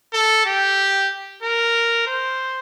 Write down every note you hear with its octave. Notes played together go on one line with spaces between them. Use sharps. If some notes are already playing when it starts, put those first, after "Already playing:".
A4
G4
A#4
C5